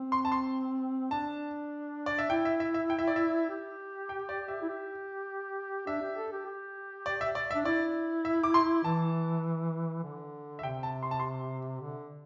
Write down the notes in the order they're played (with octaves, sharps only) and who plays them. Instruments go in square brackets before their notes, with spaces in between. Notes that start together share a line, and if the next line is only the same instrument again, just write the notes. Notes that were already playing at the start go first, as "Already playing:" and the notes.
Already playing: [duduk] C4
[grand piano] C6
A5
C6
[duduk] D4 [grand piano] A5
[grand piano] D5
E5
[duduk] E4 [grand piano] G5
[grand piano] E5
E5
E5
G5
E5
D5
E5
[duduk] G4
[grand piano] G5
D5
E5
[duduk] E4
G4
[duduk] D4 [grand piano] E5
[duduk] G4
A4
G4
G4
[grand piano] D5
E5
D5
E5
[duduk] D4
[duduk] E4 [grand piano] D5
[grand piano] E5
D6
C6
[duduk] E3 [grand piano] A5
[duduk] D3
[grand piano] E5
[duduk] C3 [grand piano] G5
[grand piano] A5
C6
A5
C6
[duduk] D3